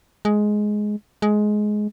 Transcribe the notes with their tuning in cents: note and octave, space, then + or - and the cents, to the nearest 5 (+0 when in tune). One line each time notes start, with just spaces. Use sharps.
G#3 +10
G#3 +15